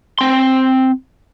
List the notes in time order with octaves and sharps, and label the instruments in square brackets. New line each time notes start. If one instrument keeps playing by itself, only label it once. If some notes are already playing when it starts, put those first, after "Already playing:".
[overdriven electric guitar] C4 C6